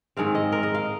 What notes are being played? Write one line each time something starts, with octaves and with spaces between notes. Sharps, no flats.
G#2 D#3 G#3 C4 F5
D#5
A#4
D#5
F5